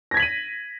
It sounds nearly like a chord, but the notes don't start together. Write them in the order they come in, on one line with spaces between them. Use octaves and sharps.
A#6 G#6 B6 F#7 D#7